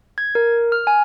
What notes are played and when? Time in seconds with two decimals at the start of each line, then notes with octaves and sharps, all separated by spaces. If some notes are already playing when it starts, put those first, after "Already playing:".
0.18 G#6
0.35 A#4
0.72 F6
0.87 G#5